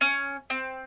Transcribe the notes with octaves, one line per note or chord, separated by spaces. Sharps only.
C#4
C4